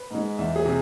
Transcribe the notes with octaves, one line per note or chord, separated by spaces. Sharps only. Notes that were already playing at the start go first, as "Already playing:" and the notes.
Already playing: B4
G#2 G#3
E2 E5
G#4
C3